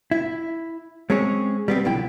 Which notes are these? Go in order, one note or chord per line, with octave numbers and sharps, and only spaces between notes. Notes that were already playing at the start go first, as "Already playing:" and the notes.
E4
G#3 C4 C#4 G#4 C#5
G3 B3 C4
B1 D3 F3 E4 G5